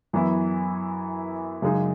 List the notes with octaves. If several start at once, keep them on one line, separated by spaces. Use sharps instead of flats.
F#2 E3 B3 E4
F#2 C#3 G#3 D#4